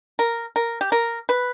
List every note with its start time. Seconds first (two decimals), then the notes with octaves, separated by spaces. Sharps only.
0.19 A#4
0.56 A#4
0.81 G4
0.92 A#4
1.29 B4